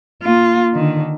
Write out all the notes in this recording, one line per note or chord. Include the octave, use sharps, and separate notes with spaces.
A#3 F4
D3 D#3